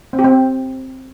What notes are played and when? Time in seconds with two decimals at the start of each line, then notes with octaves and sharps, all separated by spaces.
0.13 C4
0.19 G4
0.24 C4